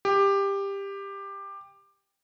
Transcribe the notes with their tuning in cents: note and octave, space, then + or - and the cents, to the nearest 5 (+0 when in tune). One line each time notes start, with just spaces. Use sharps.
G4 +15